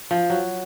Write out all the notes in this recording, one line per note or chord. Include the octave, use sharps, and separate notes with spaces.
F3
F#3